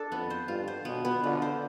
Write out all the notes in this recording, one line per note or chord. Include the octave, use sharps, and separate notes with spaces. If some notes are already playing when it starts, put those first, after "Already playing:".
Already playing: D4 A4
F2 B3
C5
G2 F4
C5
B2 B3
B3
D3 F4
C5